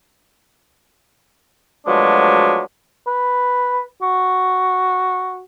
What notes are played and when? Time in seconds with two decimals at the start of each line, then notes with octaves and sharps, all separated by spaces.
1.86 B2 F3 F#3 G#3 A3 D4
3.07 B4
4.02 F#4